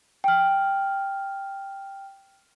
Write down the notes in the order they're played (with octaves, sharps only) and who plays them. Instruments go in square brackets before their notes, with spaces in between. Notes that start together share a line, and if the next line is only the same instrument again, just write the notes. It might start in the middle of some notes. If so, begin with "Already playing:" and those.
[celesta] G5 F6